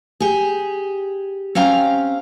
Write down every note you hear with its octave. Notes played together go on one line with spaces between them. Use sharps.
G4 G#4
C4 C#4 F5 G5 A#5